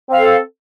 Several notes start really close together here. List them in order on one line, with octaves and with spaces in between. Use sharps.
C4 F5 A4